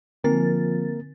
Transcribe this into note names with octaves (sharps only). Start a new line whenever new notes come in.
D3 F3 A#3 C4 A#4 A6